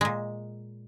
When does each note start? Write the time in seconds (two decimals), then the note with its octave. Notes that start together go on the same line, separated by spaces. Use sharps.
0.01 A#2 G#3